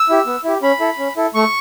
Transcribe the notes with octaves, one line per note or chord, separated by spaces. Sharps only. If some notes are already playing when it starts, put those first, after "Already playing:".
Already playing: E6
E4 G4
B3
E4 G4
C#4 B5
E4 A4
C#4
E4 A4
A3 C#6